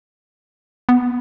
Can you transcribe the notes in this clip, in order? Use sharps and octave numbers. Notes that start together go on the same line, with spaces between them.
B3